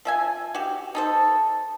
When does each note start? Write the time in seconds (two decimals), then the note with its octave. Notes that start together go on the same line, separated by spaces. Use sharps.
0.05 F3 E5 G#5
0.55 F#4 G4
0.95 D#4 A4 C5